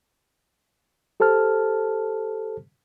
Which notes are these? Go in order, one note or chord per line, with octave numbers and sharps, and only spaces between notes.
G4 A4 C5 A5 F6